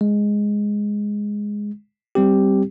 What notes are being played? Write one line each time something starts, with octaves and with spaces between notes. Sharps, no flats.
G#3
G3 C4 G4